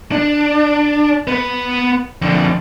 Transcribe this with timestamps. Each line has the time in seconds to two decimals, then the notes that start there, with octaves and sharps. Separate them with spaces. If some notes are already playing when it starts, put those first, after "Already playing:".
0.12 D4
1.27 B3 B4
2.22 F2 D3